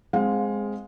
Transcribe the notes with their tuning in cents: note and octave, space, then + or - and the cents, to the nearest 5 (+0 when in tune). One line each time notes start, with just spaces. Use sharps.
G#3 +0 C4 +0 F5 +30